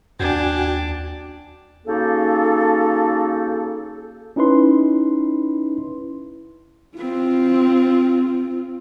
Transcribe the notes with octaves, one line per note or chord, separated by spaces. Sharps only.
D#2 D4 F#4 G5 G#5
C#3 A#3 D#4 F#4 A4
C#4 D#4 E4 B4 C6
C4 F4